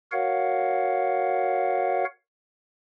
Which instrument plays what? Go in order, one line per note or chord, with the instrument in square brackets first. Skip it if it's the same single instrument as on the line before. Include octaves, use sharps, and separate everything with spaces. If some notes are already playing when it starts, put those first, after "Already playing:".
[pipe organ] F#4 A#4 C#5 F5 F#5